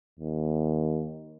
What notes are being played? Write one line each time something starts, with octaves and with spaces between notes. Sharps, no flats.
D#2